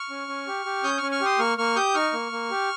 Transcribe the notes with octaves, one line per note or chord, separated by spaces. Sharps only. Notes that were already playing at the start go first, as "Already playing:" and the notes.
Already playing: C#6 F6
C#4
C#4
G4
G4
C#4 D#6 G6
C#4 C#6 F6
C#6 F6
G4 C6 D#6
A#3 C#6 F6
A#3 C#6 F6
G4 D#6 G6
D#4 C#6 F6
A#3
A#3
G4